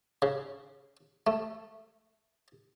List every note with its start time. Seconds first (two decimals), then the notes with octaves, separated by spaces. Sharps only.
0.22 C#3
1.27 A3